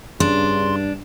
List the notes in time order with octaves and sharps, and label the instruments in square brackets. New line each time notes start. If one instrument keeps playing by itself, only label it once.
[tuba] G2 [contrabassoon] C#3 [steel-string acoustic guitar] D4 [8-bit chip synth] C6